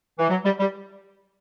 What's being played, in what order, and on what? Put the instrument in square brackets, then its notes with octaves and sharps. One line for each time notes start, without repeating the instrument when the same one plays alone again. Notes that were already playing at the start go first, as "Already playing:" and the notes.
[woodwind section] E3
F#3
G3
G3